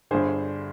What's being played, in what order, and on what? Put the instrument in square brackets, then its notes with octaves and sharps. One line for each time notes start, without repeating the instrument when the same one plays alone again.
[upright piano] G1 G2 D3 G#4 C5